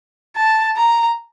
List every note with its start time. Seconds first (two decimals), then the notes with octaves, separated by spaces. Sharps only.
0.36 A5
0.77 A#5